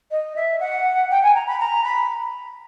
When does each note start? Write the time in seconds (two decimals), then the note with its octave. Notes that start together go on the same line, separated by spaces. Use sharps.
0.11 D#5
0.35 E5
0.59 F#5
1.10 G5
1.23 G#5
1.34 A#5
1.46 B5
1.59 A#5
1.84 B5